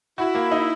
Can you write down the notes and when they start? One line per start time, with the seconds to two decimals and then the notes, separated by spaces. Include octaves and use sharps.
0.18 E4 F#4
0.35 A#3
0.52 D#4